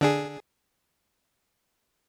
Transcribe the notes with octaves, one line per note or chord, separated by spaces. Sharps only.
D3 D4 G#4